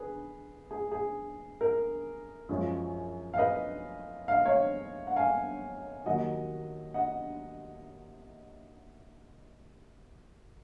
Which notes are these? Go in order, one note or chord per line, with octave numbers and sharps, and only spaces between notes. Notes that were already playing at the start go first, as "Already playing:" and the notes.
Already playing: G#4 B4
G#4
G#4
A#4
F#2 F3 G#3 C#4
F5
B4 D#5
F5
D#5
C#5 F5
F#5
F5 G#5
D#2 D#3 F#3 D#5 F#5
D#5 F#5